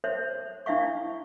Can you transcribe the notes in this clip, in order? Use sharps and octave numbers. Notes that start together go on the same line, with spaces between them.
C5 C#5 E5
D4 E4 E5 F5 C#6